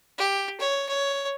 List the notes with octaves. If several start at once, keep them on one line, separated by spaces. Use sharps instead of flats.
G4
C#5
C#5